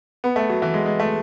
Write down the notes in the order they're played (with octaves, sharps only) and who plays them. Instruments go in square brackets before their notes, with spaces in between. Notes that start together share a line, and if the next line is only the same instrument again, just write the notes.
[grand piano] B3
A3
F#3
E3
G#3
G#3
A3